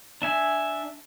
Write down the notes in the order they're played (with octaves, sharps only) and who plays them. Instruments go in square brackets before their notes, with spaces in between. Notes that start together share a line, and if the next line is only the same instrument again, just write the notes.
[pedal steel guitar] D4 E5 G#5